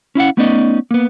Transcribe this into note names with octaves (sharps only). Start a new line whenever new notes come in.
C#4 E4 F5 F#5
A3 B3 C#4 D#4 D5 D#5
A#3 B3